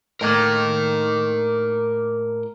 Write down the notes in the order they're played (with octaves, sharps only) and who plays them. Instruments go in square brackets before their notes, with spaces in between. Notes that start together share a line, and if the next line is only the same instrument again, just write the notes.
[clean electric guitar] A2 A#3 [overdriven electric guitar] A#4 D#5